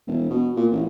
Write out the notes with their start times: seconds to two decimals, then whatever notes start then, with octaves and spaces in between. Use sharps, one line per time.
0.07 E1
0.30 B2
0.57 A#2
0.71 A1